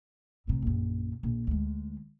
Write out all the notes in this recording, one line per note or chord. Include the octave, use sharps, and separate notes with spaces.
A2 C3
A#1 F#2
A#1
D2 G#3